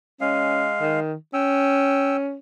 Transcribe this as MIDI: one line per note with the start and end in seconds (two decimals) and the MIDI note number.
0.21 1.00 56
0.21 0.70 61
0.21 1.00 77
0.81 1.14 51
1.34 2.37 61
1.34 2.17 79
1.34 2.17 88